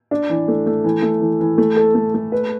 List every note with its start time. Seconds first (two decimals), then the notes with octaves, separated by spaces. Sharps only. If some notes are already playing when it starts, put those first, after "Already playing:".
0.11 D4
0.30 E3
0.48 A3
0.66 A3
0.84 E3
1.02 A3
1.21 E3
1.40 E3
1.58 A3
1.76 A4
1.95 A3
2.14 A3
2.32 B4